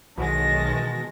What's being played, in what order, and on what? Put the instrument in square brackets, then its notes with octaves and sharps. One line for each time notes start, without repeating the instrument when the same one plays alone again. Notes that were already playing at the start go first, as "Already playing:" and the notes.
[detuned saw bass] B1 [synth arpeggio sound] B2 E3 [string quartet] D#3 G#3 A#6 [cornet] A5